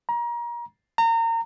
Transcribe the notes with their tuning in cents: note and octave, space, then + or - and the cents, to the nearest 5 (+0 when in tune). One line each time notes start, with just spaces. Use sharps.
A#5 +30
A#5 -30